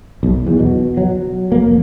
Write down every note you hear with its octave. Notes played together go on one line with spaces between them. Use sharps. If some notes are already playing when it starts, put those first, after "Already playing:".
B1
E2
B2
F#3
A#3
F1